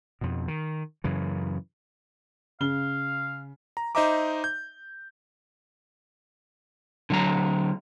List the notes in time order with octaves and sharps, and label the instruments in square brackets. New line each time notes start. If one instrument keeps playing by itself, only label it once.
[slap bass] F2 B2
D#3
F#2 C#3 E3
[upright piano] C#3 G7 [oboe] F5
[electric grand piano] A#5
D#4 C5 D#5 E5 A#5 D6
G6
[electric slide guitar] D3 F#3 A#5